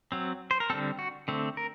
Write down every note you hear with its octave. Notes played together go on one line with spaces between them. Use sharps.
F#3 C4
C5
A#4
D3 G3 C4 A4
F#4
D3 A3 C4
A#4